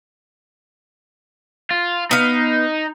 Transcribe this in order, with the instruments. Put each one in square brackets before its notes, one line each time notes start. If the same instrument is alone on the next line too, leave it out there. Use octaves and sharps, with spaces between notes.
[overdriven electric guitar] F4
[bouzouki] B3 F5 [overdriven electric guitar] D#4